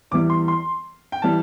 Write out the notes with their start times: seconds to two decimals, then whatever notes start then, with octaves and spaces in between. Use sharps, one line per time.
0.11 E2 E3 G3 D6
0.30 C6
0.48 C6
1.12 G5
1.22 E3 G3 A5